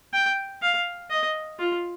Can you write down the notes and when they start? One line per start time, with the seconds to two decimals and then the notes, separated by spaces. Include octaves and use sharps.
0.13 G5
0.62 F5
1.11 D#5
1.59 F4